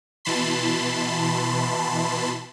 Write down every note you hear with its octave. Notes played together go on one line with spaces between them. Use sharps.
B2 E3 A5 B5 C6